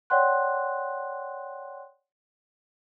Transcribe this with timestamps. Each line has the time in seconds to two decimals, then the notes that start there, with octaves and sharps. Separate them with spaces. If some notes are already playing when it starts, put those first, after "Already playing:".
0.10 C#5 D5 F#5 G5 C6 F#6